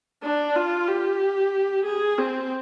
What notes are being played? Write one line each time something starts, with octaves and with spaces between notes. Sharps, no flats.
D4
F4
G4
G#4
C4